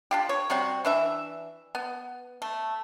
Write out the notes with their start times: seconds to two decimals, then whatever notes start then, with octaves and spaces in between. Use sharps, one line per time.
0.11 D4 F4 G4
0.29 C#5
0.50 C3 G3 C4 F#4
0.85 E3 D4 E5
1.75 B3
2.42 A3